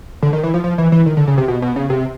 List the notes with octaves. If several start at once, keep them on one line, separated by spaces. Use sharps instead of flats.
D3
D#3
E3
F3
F3
E3
E3
D#3
D3
C#3
C3
B2
B2
C#3
C3